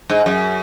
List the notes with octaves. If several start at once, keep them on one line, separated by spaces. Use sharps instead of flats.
G#2
F#2